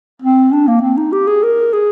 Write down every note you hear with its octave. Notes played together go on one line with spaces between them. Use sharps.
C4
D4
A#3
C4
D#4
G4
G#4
A#4
G#4